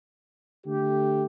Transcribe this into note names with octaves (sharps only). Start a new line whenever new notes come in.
D3 A3 G4